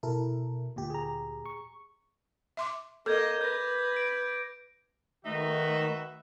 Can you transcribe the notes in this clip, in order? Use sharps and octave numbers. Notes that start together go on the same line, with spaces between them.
B2 E4 A4 A#4
D2 A#2 G4
G#4 A#5
C#6
E5 C6 D6
A#3 A4 D#5 D6 G6 G#6
B4 G6 A#6
D7
D#3 A3 D#4 F#4 B4 E5